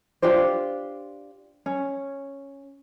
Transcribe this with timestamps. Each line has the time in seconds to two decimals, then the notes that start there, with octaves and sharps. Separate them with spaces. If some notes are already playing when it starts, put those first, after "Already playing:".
0.22 D4 F4 G4 C5
1.66 C#4